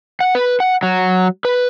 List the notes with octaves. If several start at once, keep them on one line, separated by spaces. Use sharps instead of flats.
F#5
B4
F#5
F#3
B4